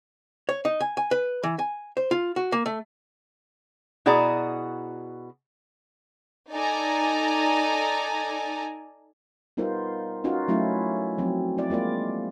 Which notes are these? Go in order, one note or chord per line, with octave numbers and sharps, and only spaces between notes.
C#5
D#4
G#5
G#5
B4
E3
G#5
C5
F4
F#4
A#3
A3
B2 E4 F#4 G#4 D5 A#5
D#4 A4 D5 G#5 A#5
G3 B3 D#4 F4 A#4 C5
C#4 D#4 F4 F#4
F#3 A3 C#4 E4
F3 F#3 C4
C4 E4 D5
G#3 A#3 F4 D5